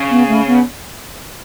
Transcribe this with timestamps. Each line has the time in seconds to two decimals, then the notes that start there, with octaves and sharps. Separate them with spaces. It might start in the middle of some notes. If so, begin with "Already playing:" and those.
Already playing: C#3
0.11 B3
0.28 A3
0.47 B3